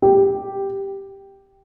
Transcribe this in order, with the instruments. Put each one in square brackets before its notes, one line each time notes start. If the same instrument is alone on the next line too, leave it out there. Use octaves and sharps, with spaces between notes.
[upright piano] G4